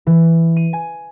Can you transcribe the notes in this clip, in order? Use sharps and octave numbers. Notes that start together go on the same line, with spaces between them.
E3
D#7
G#5